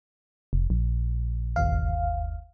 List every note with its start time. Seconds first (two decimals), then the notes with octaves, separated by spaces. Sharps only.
0.53 F1
0.70 A#1
1.56 G1 D#2 F5